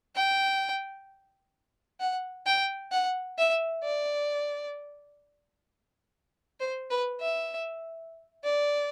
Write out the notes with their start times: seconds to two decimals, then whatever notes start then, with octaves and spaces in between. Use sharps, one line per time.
0.16 G5
2.00 F#5
2.46 G5
2.92 F#5
3.38 E5
3.83 D5
6.60 C5
6.90 B4
7.20 E5
8.44 D5